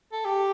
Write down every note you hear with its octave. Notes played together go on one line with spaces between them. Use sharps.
A4
G4